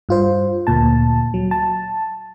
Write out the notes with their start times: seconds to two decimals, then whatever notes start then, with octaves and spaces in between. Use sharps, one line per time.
0.09 G2 F4 C5
0.67 D2 A#2 A5
1.34 F#3
1.51 A5